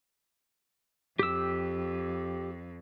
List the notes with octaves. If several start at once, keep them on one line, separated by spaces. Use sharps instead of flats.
F2 G4 E6